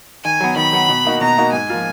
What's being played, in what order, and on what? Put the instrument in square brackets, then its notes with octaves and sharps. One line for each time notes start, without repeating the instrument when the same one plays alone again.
[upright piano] D#3 [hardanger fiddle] G#5
[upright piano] F#3 B3
[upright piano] D#3 [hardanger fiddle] B5
[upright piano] F#3 B3
B2
A#3 D#4 F#4
[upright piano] B2 [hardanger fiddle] A#5
[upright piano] A#3 D#4 F#4
[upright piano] G#2 [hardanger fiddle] G#5
[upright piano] F3 A#3 F4